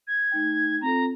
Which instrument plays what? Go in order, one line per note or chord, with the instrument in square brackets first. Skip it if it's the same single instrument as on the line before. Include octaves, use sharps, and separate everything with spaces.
[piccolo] G#6
[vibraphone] A3 D#4 G5
[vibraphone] C4 F4 A4 [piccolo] A#5